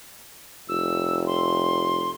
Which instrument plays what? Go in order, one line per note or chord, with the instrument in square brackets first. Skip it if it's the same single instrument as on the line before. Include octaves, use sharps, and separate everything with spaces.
[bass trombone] F1 [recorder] E6
[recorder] C6